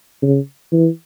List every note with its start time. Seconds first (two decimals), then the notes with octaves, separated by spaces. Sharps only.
0.22 C#3
0.72 E3